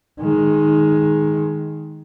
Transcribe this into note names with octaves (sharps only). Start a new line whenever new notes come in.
D#3 G#3